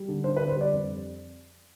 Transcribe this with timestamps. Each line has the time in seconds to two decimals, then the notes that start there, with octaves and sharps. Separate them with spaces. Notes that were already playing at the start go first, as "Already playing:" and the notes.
Already playing: G3
0.08 D3
0.24 D4 C5
0.36 B4
0.40 D3
0.48 C5
0.56 G3 D5
0.73 F2